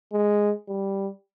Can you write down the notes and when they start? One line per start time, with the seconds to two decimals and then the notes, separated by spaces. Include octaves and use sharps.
0.13 G#3
0.68 G3